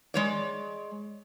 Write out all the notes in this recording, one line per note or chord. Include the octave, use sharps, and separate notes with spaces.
G#3 C#5 D5